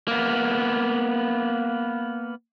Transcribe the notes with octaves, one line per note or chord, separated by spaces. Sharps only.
A#3 B3